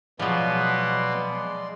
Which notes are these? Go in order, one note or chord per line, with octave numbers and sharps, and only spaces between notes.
B2 F3 F#3 G#3 B3 D5 C6